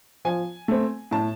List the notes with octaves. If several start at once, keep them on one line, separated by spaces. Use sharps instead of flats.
F3 G#5
A3 C4
A2 A5